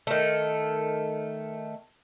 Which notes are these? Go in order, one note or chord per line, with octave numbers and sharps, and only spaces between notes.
D#3 A3